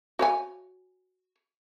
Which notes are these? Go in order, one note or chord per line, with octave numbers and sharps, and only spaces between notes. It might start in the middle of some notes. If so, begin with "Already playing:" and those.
F#4 C#5 G#5